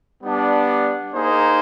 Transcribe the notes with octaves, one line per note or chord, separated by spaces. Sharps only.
G3 B3 D4
A#3 D#4 G#4 C5